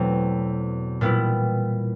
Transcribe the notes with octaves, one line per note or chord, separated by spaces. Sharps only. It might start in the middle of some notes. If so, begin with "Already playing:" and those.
Already playing: E2 B2 F#3 A3 C4
A#2 G3 B3 E4